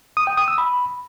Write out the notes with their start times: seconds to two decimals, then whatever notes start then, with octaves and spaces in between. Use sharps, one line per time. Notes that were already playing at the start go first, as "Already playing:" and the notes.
0.17 D#6
0.27 G5
0.37 D#6
0.48 E6
0.58 B5